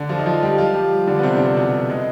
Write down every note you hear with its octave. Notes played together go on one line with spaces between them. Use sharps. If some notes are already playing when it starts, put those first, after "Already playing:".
Already playing: D3 D4
F3 F4
D#4
F3 F4
G3 G4
F3 F4
G3 G4
D3 D4
B3
C3 C4
D4
C4
B2 B3
G#3